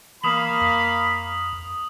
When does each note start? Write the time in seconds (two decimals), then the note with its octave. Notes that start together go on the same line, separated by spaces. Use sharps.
0.24 E3 A#3 F5 B5 D#6 F#7
0.61 F2